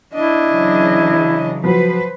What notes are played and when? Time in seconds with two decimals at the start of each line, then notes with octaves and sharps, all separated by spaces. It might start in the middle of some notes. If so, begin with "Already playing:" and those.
0.14 D4 E4 D#5
0.49 C#3 E3 F#3
1.64 F3 F#3 B4 C5